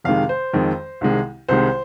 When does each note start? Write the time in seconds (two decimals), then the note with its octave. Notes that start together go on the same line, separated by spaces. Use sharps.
0.04 F2 C3 D#3 G#3 F5
0.29 C5
0.53 F2 D#3 G#3
1.01 C2 C3 D#3 G#3
1.49 C2 C3 D#3 G#3 C5